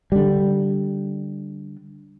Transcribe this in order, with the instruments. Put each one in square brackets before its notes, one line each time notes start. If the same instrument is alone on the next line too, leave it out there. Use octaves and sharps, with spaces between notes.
[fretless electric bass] D3 G3